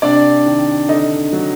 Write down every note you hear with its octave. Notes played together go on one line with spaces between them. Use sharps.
C3 D4 D5
D#3
D3 D#4 D#5
F#3